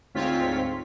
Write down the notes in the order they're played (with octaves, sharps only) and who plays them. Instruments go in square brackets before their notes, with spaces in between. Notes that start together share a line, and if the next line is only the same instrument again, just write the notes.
[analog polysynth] D2 G#2 C4 F4 C#5 B6